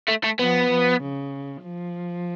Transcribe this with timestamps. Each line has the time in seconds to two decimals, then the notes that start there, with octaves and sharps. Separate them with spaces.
0.08 A3
0.24 A3
0.39 F3 B3
0.70 F3
1.01 C#3
1.63 F3